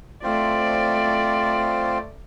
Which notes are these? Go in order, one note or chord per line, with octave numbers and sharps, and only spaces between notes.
A3 C4 F4 C5 D5